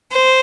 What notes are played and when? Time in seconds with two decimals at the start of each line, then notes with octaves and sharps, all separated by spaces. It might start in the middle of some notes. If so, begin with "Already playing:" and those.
0.12 C5